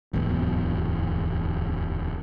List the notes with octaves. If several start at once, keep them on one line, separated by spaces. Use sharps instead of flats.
D1 G#1 E2 B2